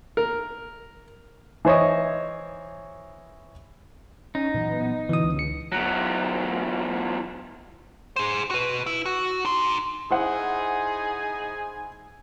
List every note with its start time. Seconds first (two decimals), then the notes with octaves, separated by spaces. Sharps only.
0.17 A#4
1.65 E3 C5 C#5 D#5
4.35 C#4 D#4
4.54 A#2 E3 F#3 B3
5.09 B2 D3 E3 D#6
5.24 C#2
5.39 C#7
5.72 E2 F#3
8.16 G#4 C5
8.51 F#4 B4
8.86 E4
9.06 F#4
9.45 D#4 C6
10.11 D#4 E4 G#4 C5 F#5 G#5